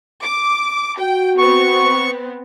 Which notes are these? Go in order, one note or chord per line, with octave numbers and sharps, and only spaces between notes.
D6
F#4 G5
B3 C4 C#6